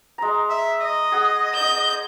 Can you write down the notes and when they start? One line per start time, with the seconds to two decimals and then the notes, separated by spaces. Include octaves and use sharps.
0.18 G#3 A#5
0.49 E5
0.81 D#5
1.12 G#4 F#5
1.55 G6